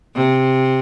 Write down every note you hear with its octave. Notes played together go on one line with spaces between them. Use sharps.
C3